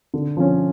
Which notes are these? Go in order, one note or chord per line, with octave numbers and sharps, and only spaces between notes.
D3
F3 C#4